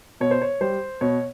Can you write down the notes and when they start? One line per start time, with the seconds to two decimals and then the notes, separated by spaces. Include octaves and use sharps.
0.20 B2 C#5
0.31 C5
0.42 C#5
0.61 G3 C5
1.01 B2 C#5